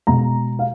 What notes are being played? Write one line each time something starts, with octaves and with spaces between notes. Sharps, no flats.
B2 G#3 A#5
F5